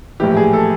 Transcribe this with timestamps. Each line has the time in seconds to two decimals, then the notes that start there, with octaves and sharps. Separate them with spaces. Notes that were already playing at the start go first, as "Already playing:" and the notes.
0.20 A#1 A2 E3 G4
0.37 G#4
0.53 A4